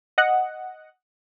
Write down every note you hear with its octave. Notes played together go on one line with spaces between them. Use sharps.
D#5 F#5